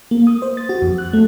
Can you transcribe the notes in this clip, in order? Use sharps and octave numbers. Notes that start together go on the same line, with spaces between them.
A#3
D#6
C5
A6
F#4
F2
F#6
A3